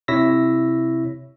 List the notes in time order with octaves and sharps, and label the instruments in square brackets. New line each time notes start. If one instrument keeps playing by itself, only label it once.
[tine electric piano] C3 E4 C#5 E6 A#6 B6